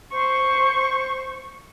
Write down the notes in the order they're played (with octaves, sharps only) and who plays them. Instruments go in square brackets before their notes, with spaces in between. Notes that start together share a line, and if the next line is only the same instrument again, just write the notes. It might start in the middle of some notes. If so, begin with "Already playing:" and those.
[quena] C5 [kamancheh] C#6